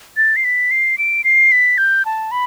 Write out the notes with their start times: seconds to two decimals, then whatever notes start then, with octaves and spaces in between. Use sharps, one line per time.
0.17 A6
0.36 C7
0.44 B6
0.71 C7
0.98 D7
1.24 C7
1.52 B6
1.78 G6
2.05 A5
2.31 B5